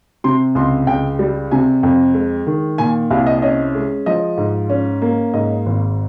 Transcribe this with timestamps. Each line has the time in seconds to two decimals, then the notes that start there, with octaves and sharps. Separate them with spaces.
0.24 C3 C6
0.55 C#2 C6
0.87 C#2 G5
1.19 G3
1.51 C3 G#5
1.83 F2
2.14 G#3
2.46 D#3
2.78 A#2 G#5
3.10 C2 F5
3.27 D#5
3.42 C#4 D#5
3.75 G#3
4.06 F3 D#5
4.37 G#2
4.70 C#4
5.02 A#3
5.34 G#2 D#5
5.66 G#1